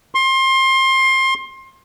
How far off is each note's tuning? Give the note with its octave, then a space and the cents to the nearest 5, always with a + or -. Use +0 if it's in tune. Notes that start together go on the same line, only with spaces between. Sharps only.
C6 +25